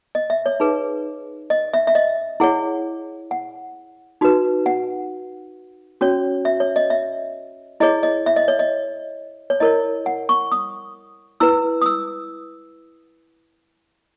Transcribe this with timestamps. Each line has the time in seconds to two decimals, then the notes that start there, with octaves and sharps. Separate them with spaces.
0.15 D#5
0.30 E5
0.46 C#5
0.60 D#4 G#4 B4
1.50 D#5
1.74 E5
1.87 E5
1.95 D#5
2.40 E4 G#4 C#5 F#5
3.31 F#5
4.21 D#4 F#4 B4
4.66 F#5
6.01 C#4 F#4 C#5
6.45 E5
6.60 C#5
6.76 D#5
6.90 E5
7.80 E4 G#4 C#5 D#5
8.03 D#5
8.26 E5
8.36 D#5
8.48 C#5
8.59 D#5
9.50 C#5
9.60 E4 A#4 C#5 D#5
10.06 F#5
10.29 C#6
10.52 D#6
11.40 E4 B4 E6
11.82 D#6
11.86 E6